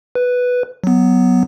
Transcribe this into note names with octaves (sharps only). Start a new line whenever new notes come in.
B4
F#3 B3